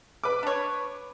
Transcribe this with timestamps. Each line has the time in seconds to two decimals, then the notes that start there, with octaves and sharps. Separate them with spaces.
0.24 B4 D6
0.43 D4 C#5